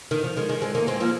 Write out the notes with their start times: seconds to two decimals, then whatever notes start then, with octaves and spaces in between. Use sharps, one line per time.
0.11 D#3
0.24 F3
0.37 D#3 G#3
0.49 D#3 G#3
0.62 G#3 C4
0.75 A#3 D#4
0.87 G#3 C4
1.00 F3 A#3